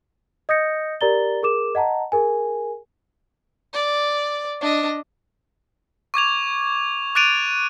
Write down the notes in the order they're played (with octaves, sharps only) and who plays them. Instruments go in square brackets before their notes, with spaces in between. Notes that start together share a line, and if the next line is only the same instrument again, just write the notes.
[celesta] D#5 D#6 G6 A#6 C#7
G4 A#4 D5 A#5 A6 G7
G#4 A#4 D6 E7
D#5 F#5 A5 A#5
G#4 A#4 G#5
[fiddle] D5
D4 D#5
[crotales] C#6 D6 G#6 F7
D6 F#6 A6 D7 D#7 F7